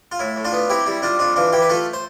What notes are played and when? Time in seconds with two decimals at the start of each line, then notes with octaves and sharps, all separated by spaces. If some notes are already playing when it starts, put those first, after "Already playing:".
0.12 F4
0.19 A2 E4
0.36 A2
0.45 D4 F4
0.53 B3
0.70 C4 E4 G4
0.86 G3 E4
1.02 G3 D4 F4
1.19 F2 D4 F4
1.36 E3 D4 F4
1.53 E3 E4 G4
1.62 B4
1.69 A3 F4 A4
1.93 C5